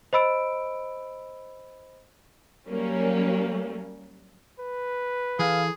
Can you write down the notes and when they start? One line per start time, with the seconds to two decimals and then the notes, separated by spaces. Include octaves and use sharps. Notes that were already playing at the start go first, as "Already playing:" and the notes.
0.13 C5 D#5 B5 E6 D7
2.65 F#3 G3 A#3 C#4
4.60 B4
5.39 E3 G#4 A4 F5